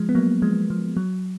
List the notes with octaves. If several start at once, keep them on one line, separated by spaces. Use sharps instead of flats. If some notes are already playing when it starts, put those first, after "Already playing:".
Already playing: F3 G#3
B3
F#3 A#3
F3 G#3
F3
F#3